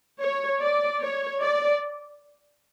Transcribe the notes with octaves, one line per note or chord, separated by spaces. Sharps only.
C#5
D5
C#5
D5